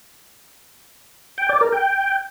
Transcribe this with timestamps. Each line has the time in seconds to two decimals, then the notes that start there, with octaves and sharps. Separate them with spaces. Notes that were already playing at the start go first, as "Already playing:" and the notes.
1.38 G5
1.49 D5
1.61 A#4
1.72 G5